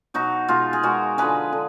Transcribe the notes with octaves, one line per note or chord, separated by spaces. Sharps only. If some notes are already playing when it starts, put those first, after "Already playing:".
B2 F#3 D#4 F#4
B2 G#3 F4 G#4
G#4
B2 G#3 F#4 A#4
D3 F3 G#3 G#4 B4
D3